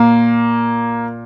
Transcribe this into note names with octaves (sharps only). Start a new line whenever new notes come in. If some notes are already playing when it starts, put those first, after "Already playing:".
Already playing: A#2 A#3